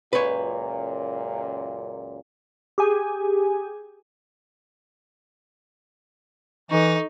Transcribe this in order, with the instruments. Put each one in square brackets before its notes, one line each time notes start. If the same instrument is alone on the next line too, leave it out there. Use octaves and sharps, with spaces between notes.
[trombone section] C#2 F#2 A#2 [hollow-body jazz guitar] B4 C#5
[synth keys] G4 G#4 G#5
[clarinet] E3 [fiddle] D#4 [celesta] A4 C#6